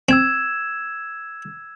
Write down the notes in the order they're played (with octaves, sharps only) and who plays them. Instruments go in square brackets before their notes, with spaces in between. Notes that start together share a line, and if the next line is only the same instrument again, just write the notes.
[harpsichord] C4 [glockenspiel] E6 G#6 E7